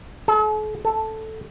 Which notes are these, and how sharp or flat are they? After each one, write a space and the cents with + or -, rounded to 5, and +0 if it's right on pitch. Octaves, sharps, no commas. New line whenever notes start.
A4 -45
A4 +0